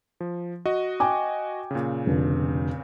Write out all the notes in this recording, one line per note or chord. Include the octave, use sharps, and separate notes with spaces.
F3
F#4 D#5
G5 G#5 D6
A#2 C#3
F1 D3